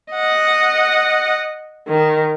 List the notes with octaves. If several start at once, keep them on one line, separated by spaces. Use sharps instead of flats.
D#5 F#5
D#3